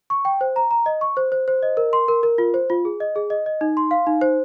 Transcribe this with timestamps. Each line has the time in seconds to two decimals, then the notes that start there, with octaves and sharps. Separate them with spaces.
0.10 C#6
0.25 G5
0.41 C5
0.56 A#5
0.71 A#5
0.86 D#5
1.01 C#6
1.17 C5
1.32 C5
1.48 C5
1.63 D#5
1.77 A#4
1.93 C6
2.08 A#4
2.23 A#4
2.38 F4
2.54 C5
2.70 F4
2.85 G#4
3.00 D#5
3.16 G#4
3.30 D#5
3.46 D#5
3.61 D#4
3.77 C6
3.91 F5
4.07 D#4
4.21 C5